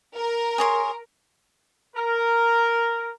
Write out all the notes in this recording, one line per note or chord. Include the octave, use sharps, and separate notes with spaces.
A#4
G#4 C#5 C6
A#4